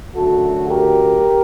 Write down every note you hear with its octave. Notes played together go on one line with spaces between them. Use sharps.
F#2 D3 F#3 A3 F#4 A4
G4 A#4